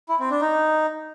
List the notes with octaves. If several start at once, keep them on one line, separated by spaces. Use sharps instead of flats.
E4
C4
D4
D#4